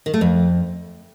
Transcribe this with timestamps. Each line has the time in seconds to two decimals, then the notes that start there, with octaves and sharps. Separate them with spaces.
0.06 D#3
0.14 A3
0.21 F2